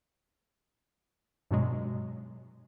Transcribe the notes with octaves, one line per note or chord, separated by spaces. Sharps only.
G2 B2 F#3 G#3